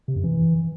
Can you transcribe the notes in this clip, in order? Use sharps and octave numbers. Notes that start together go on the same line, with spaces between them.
C3
F#2
E3